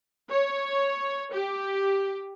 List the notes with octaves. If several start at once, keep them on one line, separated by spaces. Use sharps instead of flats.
C#5
G4